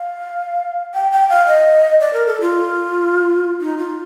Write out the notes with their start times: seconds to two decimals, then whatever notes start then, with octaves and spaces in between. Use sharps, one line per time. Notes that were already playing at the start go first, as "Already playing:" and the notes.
Already playing: F5
0.94 G5
1.11 G5
1.29 F5
1.47 D#5
2.00 D5
2.13 A#4
2.26 A4
2.41 F4
3.61 D#4
3.78 F4